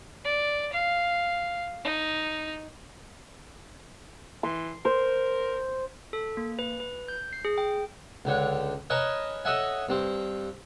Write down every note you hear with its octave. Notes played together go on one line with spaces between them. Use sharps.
D5
F5
D#4
E3 C6
A#4 C5
A4
A#3
B4
B4
G6
C7
G#4
G5
C#2 D3 C#5
A#4 B4 C#5 D#5 G#5 A5
A4 C#5 D#5 E5 F#5 G#5
G2 C4